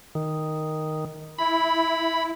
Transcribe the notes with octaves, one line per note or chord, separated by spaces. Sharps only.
D#3
E4 B5